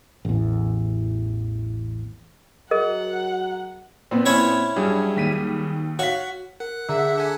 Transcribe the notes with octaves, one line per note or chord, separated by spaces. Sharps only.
A1 E2
F#3 G#4 A#4 D#5 F#5
A#2 B3 C4
C#4 E4 C#5
G2 F#3 G3 G#4
D#2 B6 D#7
F#4 C#5 F5 F#5 B6
A#4 F#5
D3 G#4 E5 A#5 E6
A4 F#5 G#5